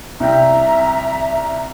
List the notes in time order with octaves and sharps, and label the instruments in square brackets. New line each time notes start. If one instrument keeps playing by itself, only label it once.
[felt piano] C2 G5 [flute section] E5 A#5